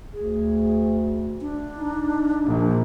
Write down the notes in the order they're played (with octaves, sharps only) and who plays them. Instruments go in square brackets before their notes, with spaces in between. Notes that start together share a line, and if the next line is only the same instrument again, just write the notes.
[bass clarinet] D2 [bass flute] G#4
[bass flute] D4
[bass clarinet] D#4
[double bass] A#1